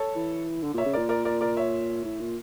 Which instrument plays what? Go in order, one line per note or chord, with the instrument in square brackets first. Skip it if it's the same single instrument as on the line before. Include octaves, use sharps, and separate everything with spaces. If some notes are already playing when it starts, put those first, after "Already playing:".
Already playing: [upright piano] A4 C#5
[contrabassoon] E3
D3
[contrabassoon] A#2 [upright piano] C#5 E5
[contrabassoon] C#3
[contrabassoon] A#2 [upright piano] A#4 D5
[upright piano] A#4 D5
A#4 D5
A#4 D5
C#5 E5
[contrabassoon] A2
A#2